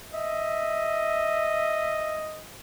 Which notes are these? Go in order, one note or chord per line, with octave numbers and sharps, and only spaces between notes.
D#5 E5